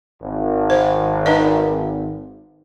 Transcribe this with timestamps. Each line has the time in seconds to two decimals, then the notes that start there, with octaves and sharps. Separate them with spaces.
0.22 G#1
0.70 C5
1.26 D#4 B4 D#5